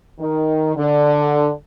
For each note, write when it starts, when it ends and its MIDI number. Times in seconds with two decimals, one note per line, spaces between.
0.19 0.74 51
0.76 1.50 50